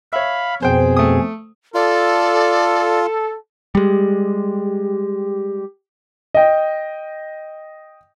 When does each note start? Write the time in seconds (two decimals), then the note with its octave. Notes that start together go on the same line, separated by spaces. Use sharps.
0.13 C#5 E5 F5 B5
0.63 F2 B2 C4 G#4 C5 G5
0.97 A3 D#6
1.75 F4 A4 D5
3.75 G3 G#3 G4
6.35 D#5 G5